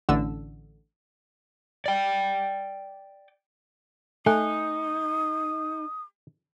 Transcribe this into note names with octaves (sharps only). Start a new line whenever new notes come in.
A1 D3 E6
D5 G5
A3 D#4 G#5 D#6 F#6